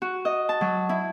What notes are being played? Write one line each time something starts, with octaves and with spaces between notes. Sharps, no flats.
F#4
D#5
A5
F#3
E4